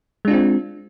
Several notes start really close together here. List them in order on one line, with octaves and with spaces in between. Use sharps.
G#3 D4 F4 C4